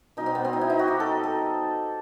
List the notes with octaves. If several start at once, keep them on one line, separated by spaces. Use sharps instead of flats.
B2 G3 D#4
C4
B3
C4
D#4
E4
D#4
F#4
G4
A4
A4